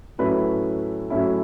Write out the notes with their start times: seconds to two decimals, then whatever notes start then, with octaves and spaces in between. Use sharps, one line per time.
0.18 A2 F#3 A3 C#4 E4 B4
1.10 A2 F#3 A3 C#4 E4